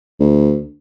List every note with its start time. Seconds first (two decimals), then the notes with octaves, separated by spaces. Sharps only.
0.20 D2